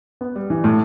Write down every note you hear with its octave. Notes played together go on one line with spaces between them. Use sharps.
B3
G3
E3
A2